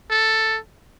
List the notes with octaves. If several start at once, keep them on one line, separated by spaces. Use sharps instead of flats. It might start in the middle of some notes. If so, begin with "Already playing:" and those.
A4